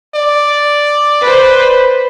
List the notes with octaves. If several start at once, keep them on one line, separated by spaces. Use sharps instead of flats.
D5
B4 C5